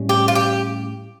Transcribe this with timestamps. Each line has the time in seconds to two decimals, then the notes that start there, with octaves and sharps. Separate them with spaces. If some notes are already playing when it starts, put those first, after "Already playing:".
Already playing: A2 G3 C#4
0.09 G4
0.28 F4
0.35 G4